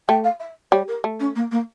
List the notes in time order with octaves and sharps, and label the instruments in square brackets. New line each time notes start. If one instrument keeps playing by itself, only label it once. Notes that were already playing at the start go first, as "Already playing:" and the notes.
[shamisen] A3 [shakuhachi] G5
[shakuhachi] F5
E5
[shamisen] G3 [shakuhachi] C#5
[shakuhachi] A#4
[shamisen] A3
[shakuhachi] C#4
A#3
A#3